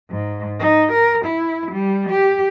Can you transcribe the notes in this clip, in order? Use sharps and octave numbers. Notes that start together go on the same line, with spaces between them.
G#2
D#4
A#4
E4
G3
G4